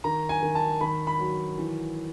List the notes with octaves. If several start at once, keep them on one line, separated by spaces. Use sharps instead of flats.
D#3 A#5
G#5
D#3
A5
D#3 B5
B5
F#3
E3